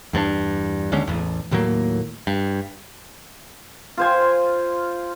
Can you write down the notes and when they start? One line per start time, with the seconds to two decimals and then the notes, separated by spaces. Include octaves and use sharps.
0.13 E2 G2 B3 D4
0.92 D#2 D3 G#3 C#4
1.07 A1 E2
1.51 D#2 A2 F#3 A#3
2.27 G2
3.98 F4 C5 G#5